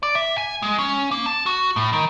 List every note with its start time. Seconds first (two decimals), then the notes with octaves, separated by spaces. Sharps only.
0.03 D5
0.15 E5
0.38 G#5
0.62 G#3
0.79 C#4
1.11 A#3
1.26 A5
1.46 F#4
1.76 A2
1.93 D#3